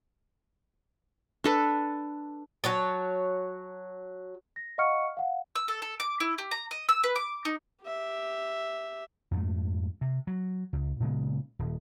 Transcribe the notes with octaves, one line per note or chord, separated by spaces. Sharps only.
D4 A4 B4
F#3 C#5 A5
A#6
D#5 F5 F#5 C#6 F6 C#7
F5 F#5
E6
A4
A4
D6
E4
G4
A#5
D#5
E6
B4
D6
D#4
G4 E5
F2 G#2 G#3 A3
C3
F#3
C#2
A#2 C#3 G#3 B3
D#1